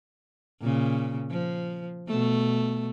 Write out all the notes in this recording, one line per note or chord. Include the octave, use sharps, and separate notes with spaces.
A#2 C#3
F3
B2 A3